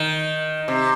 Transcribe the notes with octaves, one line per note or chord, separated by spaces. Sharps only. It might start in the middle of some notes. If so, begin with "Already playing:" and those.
Already playing: D#3
C3